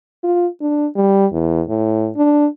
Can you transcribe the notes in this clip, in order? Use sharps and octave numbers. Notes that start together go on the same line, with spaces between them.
F4
D4
G3
E2
A2
D4